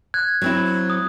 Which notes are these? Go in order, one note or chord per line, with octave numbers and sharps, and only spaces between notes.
F#6 G#6
F#3 C4 E4
D#6